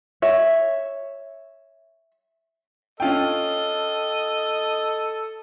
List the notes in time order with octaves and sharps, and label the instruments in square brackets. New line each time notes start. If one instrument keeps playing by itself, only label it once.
[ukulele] C#5 E5
[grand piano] C#4 F4 G5 [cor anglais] A4 [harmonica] D#5